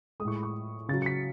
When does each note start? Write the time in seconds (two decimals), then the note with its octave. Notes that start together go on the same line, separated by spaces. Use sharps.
0.20 G#3 D#6
0.25 A2 C#6
0.35 B5
0.43 C#6
0.89 C#3 F#3 A6
1.02 C#7
1.06 B6